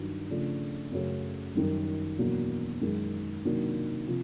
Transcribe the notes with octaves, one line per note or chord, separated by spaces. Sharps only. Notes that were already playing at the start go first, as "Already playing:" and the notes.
Already playing: G2 D#3 F#3
C#3 F3 A3 D4
F#2 C#3 F#3 A3 C#4
F#2 D#3 G3
E2 B2 F#3 A#3 D4
F#2 D#3 G#3
C3 D#3 F#3 A#3 D4
C3 F3